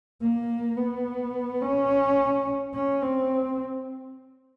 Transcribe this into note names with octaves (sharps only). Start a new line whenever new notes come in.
A#3
B3
C#4
C#4
C4